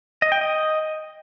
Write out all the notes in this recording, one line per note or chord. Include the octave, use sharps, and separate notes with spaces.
D#5
G5
D#5